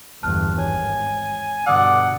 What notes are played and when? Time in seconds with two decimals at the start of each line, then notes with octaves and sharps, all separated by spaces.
0.23 G1 E2 G2 A5 F6 F#6
0.58 G#1 C#5 G#5
1.67 G2 B2 D3 D5 F#5 D#6 E6